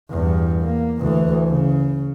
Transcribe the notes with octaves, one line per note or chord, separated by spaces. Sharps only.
E2 G2
A#3
D2 E3
C#3